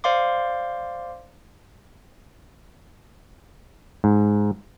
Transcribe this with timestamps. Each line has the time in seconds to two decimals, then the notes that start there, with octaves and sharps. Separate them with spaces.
0.04 C5 D5 F5 C6 D6
4.04 G#2